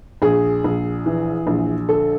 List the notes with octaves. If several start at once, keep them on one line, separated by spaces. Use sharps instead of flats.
A#1 G#4
A#1
E3
A#1
D3 A4